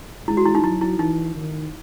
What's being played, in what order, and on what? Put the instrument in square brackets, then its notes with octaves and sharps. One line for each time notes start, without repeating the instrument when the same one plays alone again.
[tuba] G#3 [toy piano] E4
[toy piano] F#4
E4
D#4
[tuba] F#3 [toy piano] E4
[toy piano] E4
[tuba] E3 [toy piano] D#4
[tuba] D#3